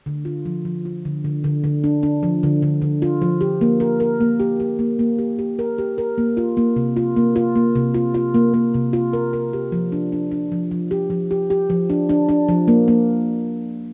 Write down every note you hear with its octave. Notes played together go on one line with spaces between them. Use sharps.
D3
F4
F3
F3
F4
D3
D3
D3
D3
D4
D4
F3
D3
D3
D3
F4
F3
G4
A#3
A#4
A#4
A#3
G4
G4
A#3
A#3
G4
G4
A#4
G4
A#4
A#3
F4
A#3
C3
F4
A#3
F4
A#3
C3
F4
F4
A#3
A#3
C3
F4
A#4
A#4
G4
F3
D4
D4
D4
F3
F3
G4
F3
G4
G4
F3
D4
D4
D4
F3
A#3
A#3